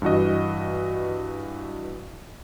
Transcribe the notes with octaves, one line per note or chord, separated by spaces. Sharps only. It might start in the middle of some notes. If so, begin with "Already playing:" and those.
G2 E3 F#4 D#5